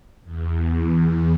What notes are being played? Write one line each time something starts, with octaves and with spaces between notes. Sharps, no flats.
E2